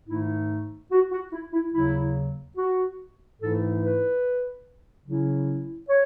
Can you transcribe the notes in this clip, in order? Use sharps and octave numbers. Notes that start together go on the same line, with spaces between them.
G#2 D#3 A3 D#4 E4
F#4
F#4
E4
E4
D#2 C#3 F#3 E4
F#4
G#2 E3 A3 E4 A4
B4
C#3 F#3 C#4 E4
C#5